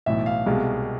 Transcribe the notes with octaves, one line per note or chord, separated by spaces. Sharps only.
B1 A2 E3 E5
F5
C2 B2 G#3